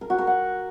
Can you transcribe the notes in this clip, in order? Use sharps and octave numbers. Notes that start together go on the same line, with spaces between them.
A#4
F#4
A#4
F#5